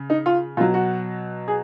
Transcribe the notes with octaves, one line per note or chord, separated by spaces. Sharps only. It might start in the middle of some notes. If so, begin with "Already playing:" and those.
Already playing: C#3
D#4
F4
B2 F#3 F4
F#4
G#4